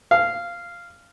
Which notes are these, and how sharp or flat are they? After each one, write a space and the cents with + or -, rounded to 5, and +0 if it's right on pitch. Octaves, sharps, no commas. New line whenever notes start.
F5 -10